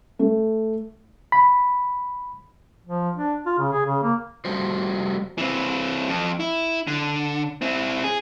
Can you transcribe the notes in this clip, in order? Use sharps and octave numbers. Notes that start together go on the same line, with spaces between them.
A3
B5
F3
D4
F4
C#3
G#4
C#3
A#3
G3 A3 F#4 C5
E3 C4
F2
E4
D3
C4 E4
G#4